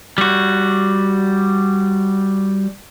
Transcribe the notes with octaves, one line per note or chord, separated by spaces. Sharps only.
G3 F#4